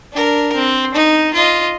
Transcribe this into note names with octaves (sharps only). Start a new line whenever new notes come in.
D4 A#4
C4
D#4
F4 D#5